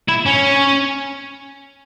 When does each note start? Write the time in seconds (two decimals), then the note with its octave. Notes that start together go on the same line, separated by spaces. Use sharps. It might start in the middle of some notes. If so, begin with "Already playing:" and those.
0.09 E4
0.27 C#4